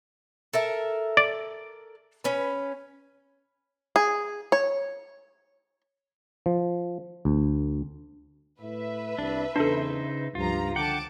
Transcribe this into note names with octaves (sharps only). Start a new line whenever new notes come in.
A4 A#4 E5
D5
C#4 B4
G#4
C#5
F3
D2
A2 B4 E5
C2 D4
E2 C#3 D4 D#4 A4 C5
C#2 G2 F3 F4 A#5
D3 F#5 G5 A5 D6